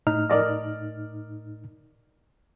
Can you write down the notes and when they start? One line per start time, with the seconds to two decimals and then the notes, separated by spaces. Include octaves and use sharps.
0.07 A2 D#4 F6
0.30 A#4 D5 D#5